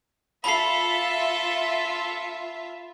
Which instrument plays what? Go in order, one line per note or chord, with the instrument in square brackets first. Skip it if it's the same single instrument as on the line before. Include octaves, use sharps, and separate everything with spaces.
[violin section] F4 E5 [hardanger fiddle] A4 [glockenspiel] B5 C7